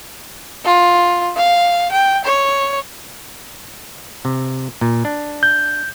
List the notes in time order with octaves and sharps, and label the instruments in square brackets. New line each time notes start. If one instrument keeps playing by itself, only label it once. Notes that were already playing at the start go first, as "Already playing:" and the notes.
[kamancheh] F4
F5
G5
C#5
[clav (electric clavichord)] C3
A#2
D4
[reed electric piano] G6